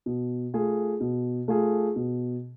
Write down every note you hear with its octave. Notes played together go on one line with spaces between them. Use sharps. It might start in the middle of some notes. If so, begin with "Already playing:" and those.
B2
A3 F4 G#4
B2
A3 F4 G#4
B2